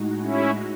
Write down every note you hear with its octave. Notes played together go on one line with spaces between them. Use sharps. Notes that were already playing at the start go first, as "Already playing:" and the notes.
Already playing: A2 G#3 D#4 F#4
C#4 E4